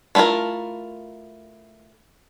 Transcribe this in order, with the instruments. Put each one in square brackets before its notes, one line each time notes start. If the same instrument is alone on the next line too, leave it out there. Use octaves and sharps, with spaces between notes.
[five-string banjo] A3 B3 E4 F4 A#4